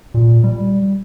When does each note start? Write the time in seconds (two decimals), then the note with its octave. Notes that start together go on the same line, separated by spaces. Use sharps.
0.14 A#2
0.44 G3